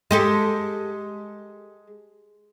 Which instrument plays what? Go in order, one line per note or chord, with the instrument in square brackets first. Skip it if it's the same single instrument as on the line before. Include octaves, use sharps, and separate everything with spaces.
[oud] G#3 G4 A4